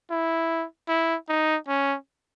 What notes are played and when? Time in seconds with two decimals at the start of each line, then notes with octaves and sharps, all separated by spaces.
0.10 E4
0.88 E4
1.29 D#4
1.68 C#4